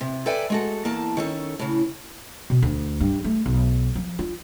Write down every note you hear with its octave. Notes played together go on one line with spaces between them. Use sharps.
C3
A4 B4 D5 E5 G5 G#5
G#3 F#4 A4
E2 A#3 A5
D#3 C#4 A4
A2 C#3
B2
D2
G2
A3
B1
F3
F4